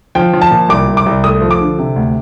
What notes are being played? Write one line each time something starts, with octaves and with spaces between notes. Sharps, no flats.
F3 G5
F3
A5
A#2
C2 D6
C2
D6
C2
A3 D#6
F3
D6
D3
C3
D2